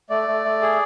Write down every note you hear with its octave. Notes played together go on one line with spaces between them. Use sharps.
A3 D5
A3
A3
G#4